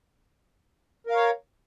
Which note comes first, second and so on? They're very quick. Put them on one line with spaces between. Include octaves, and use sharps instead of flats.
A#4 F5 C#5